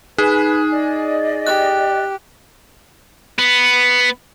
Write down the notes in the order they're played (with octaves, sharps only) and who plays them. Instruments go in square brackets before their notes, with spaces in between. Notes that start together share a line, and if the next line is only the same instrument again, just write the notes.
[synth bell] D#4 [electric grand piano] G#4 [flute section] B4
[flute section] D5 D#5
[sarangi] G4 [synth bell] F#6
[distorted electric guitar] B3